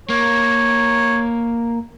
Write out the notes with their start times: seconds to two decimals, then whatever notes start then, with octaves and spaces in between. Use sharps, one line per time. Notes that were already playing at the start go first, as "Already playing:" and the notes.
0.09 A#3 C#5